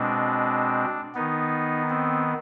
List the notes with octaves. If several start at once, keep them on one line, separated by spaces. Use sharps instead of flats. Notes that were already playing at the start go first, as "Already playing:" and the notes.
Already playing: B2 G#3 C4 D4
D#3 B3 D#4
C4